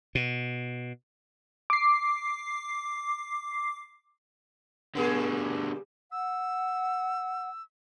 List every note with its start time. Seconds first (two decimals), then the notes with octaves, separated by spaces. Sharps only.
0.15 B2
1.70 D6 C7
4.95 B2 D3 G3 A#3 G#4
6.12 F#5 E6